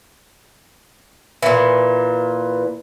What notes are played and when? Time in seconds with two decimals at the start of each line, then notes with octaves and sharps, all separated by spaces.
1.43 A#2 E3